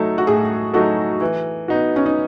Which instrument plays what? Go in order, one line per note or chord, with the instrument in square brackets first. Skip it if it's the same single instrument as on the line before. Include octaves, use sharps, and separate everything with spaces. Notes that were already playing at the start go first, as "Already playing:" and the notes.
Already playing: [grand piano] F#3 A3 D#4 A4
[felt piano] F#4
[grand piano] A2 [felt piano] G#4
[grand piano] F#3 A3 D#4 A4 [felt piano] F#4
[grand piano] E3
B3 D#4 F#4
[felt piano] C#4
D#4